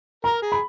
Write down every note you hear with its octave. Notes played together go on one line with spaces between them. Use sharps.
A#4 A#5
G#4
B5